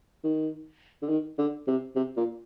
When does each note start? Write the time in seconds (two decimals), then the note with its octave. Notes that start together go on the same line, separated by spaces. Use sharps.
0.24 D#3
1.02 D3
1.09 D#3
1.38 D3
1.67 C3
1.96 C3
2.17 A#2